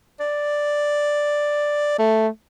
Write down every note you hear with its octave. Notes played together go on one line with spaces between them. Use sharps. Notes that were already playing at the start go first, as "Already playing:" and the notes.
D5
A3